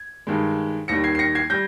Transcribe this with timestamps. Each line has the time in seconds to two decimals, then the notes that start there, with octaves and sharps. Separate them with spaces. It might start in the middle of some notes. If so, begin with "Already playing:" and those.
Already playing: G#6
0.27 G2 D#3 G#3
0.88 D#2 D#3 G3 A#6 C#7
1.04 G#6 C7
1.15 C7
1.19 A#6 C#7
1.35 G#6 C7
1.50 G3 G6 A#6